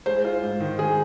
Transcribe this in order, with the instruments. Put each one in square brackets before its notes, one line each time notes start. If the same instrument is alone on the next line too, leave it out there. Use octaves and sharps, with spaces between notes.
[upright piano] G#3 [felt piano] C5
[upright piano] F4
G#2
D#3
[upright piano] G#3 [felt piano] G#4